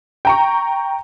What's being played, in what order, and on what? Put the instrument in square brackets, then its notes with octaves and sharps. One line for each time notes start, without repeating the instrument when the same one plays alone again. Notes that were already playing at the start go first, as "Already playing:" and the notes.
[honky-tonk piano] G5 A#5 C#6